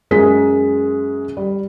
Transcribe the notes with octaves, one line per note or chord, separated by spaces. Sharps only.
F#2 G#3 G#4 A#4 D#6 B6
G3